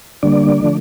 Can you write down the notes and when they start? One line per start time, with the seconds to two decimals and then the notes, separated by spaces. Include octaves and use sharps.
0.23 D3 G3 A#3 D4 D5
0.62 D3 F3 A3